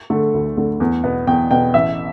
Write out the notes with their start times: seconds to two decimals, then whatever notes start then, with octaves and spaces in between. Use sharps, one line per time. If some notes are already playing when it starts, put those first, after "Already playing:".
0.10 D3 A3
0.34 D2
0.57 D3 A3
0.80 E2
1.04 B2 B3
1.27 E2 G5
1.51 B2 B3 G5
1.74 A1 E5